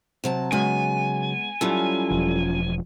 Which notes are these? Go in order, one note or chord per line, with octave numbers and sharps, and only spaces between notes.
C3 F#3 A5
C#3 F#3 G#3 B3 G#5
F#3 G3 C#4 E4 F4 A4
E1 F3